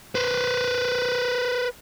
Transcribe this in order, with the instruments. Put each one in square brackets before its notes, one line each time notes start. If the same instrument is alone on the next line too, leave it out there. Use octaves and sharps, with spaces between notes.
[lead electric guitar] B4 C5